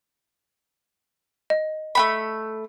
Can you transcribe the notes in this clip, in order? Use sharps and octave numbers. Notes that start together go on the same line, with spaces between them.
D#5
A3 B3 B5